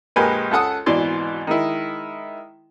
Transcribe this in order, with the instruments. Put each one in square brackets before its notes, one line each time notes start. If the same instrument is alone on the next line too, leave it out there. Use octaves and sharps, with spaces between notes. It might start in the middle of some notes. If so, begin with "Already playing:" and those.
[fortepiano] A#1 G#3 G4 A#4 B4 G#5
C#2 A4 F#5 D#6
G#1 B2 E3 D5 C6
D#3 G#3 E4